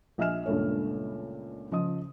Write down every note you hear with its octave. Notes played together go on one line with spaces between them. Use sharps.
A#1 D#5 E5 G#5 F6 E7
C#2 G2 A#2 A3 C#5
C#3 F3 D#5 D#6